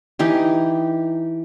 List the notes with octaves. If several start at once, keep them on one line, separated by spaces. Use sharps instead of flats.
E3 D#4 G4